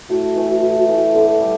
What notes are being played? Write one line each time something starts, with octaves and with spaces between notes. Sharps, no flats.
A2 F#4
E3 A3
A2
E3 A3
D3 A4
G3